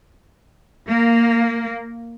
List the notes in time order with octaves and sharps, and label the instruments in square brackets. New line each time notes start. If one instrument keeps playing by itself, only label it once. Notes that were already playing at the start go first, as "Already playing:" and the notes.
[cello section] A#3